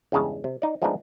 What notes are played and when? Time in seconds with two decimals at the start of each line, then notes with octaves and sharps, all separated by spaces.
0.12 E2 G2 C#3 G#3 A5
0.44 C3
0.62 D#4 D5
0.82 F3 G#3 A3 B3 D4 D#4